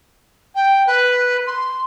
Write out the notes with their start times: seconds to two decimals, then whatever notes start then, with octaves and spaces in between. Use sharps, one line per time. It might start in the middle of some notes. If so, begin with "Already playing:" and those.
0.55 G5
0.87 B4
1.47 C6